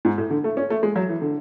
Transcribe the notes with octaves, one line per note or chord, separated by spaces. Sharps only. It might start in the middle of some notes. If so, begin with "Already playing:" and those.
G#2
A2
D3
A3
C#4
A3
G#3
F#3
E3
D3